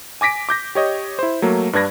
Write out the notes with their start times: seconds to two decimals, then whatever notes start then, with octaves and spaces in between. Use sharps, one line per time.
0.21 G#5 D6 A#6 B6 D7
0.49 D6 G6 A#6
0.75 G4 C#5 D#5
1.19 E4 C5
1.42 F#3 A3 A#3
1.73 G2 D4 B4 G#6 A#6